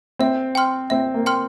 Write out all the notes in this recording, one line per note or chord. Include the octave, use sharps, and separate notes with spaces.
C4 E5
G5 C6 F6
C4 E5
A#3
G5 C6 F6